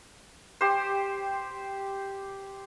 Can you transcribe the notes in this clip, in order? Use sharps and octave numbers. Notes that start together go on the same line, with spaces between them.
G4 C5